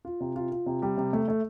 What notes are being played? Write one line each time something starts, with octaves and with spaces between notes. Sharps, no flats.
F4
C3
F4
F4
C3
G3
C3
A3
A3